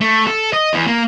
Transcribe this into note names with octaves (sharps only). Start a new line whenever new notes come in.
A3
A4
D#5
E2
A#3